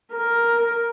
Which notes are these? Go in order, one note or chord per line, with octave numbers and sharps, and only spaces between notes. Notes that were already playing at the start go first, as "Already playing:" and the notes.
A#4